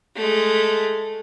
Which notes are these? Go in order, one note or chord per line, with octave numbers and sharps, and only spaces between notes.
G#3 A3